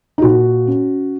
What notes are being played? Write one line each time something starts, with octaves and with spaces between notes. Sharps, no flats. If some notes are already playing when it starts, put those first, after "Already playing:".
D#4
A#2 F#4
C#4